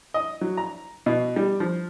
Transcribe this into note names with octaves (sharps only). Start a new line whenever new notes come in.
D#5
F#3
A#5
B2
G3
F3